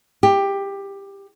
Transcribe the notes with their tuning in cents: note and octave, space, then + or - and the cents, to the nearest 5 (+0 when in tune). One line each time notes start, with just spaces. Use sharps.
G4 +15